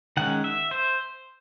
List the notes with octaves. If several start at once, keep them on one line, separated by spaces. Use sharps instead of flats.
D#3 G#3 C#4 F#5
E5
C5